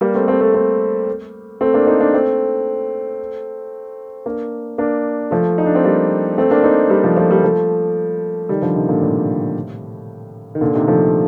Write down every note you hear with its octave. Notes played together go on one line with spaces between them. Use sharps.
G3 A#3
A3 C4
A3 C4
A3 C4
A3 C4
A3 C4
A#3 D4
C4 D#4
A#3 D4
A3 C4
A#3 D4
A#3 D4
F3 A3
D#4
D4
C4
G3 A#3
A3 C4
A#3 D4
C4 D#4
G3 A#3
F3 A3
F3 A3
G3 A#3
F3 A3
D#3 G3
D3 F3
C3 D#3
A#2 D3
A2 C3
D#3
A#2 D3
C3 D#3
F3 A3